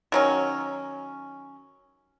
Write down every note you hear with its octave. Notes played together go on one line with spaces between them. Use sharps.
D#3 F#3 C#4